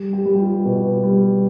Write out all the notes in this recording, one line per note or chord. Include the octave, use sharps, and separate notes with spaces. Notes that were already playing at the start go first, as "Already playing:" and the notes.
Already playing: G3
G4
G3
G4
F4
B2
G3